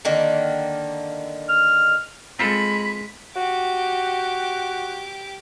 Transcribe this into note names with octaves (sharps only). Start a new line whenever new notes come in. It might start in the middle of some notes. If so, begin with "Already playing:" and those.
D3 D#3 A#3
F6
G#3 C4 F4 A4 B5 B6
F#4 G4 D6